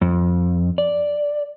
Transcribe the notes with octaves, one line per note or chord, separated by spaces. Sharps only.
F2
D5